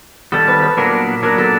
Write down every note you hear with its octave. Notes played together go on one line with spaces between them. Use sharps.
D#3 G3 B3 A4
B4
B4
A#2 F#3 B3 D4 A#4
A#2 F#3 B3 D4 A#4
A4